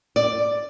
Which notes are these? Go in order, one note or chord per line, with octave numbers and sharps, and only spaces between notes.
D5